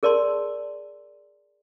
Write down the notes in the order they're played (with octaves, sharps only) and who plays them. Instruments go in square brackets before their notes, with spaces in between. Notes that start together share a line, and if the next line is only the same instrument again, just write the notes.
[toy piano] G#4 A#4 D5 A5 C6